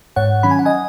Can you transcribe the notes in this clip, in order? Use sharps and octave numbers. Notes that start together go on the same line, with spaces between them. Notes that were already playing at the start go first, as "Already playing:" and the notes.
G#2 C#5 F#5
D#3 F#3 C#4 B5
G#5
F#5
D#5 G#5